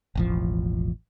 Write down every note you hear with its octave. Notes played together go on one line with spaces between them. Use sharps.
E1 A1 F3